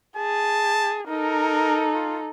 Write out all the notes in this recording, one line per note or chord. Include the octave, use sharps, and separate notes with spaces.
G#4 A5
D#4 A4 A#4
F4